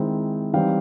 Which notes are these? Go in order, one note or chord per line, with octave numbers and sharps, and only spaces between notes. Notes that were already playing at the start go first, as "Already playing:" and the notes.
Already playing: D#3 G#3 C4 E4
E3 G3 C4 D#4 F5 G5